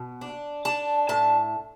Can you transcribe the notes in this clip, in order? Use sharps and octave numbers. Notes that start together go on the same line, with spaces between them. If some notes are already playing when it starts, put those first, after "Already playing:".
Already playing: B2
D4
D4 A5
A2 A5